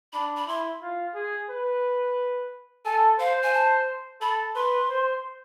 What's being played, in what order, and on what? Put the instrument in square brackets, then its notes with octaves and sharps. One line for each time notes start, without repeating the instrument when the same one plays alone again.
[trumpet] D4 [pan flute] B5
[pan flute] B5
[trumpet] E4 [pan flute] C6
[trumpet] F4
G#4
B4
[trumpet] A4 [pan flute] G#5
[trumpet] C5 [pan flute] F5
[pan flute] G#5
A5
[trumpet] A4 [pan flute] B5
[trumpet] B4 [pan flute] C6
[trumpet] C5